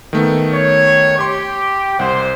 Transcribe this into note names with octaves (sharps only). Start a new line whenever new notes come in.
D#3 A3 B3
C#5
G4 G5 C6
C2 C5 F#5